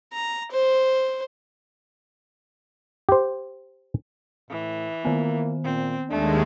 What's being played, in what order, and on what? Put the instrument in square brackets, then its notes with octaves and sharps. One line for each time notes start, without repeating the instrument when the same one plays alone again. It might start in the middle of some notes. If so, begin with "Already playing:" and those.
[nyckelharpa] A#5
C5
[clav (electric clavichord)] G4 C5
[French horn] A2 [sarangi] E3
[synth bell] D#3 B3 [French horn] A#3
[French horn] A#2 [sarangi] C4
[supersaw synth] D#2 G#3 [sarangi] A3 [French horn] D4